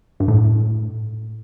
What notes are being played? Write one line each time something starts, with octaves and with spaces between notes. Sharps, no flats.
G2
A2